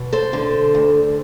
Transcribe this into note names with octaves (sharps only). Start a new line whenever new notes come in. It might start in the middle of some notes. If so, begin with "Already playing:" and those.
Already playing: B2
A4 C5
D3
D2